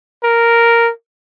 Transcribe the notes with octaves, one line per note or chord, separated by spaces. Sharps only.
A#4